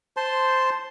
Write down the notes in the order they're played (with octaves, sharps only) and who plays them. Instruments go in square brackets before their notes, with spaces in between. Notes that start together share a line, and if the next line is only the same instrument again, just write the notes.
[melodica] C5 A5 C6